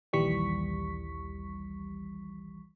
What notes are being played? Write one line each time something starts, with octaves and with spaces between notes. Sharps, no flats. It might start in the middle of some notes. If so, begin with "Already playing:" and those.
A#1 D#2 E3 G3 C#6 B6